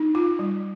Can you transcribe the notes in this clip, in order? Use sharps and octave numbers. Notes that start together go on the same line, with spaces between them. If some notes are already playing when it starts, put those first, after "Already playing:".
Already playing: D#4
F4
G3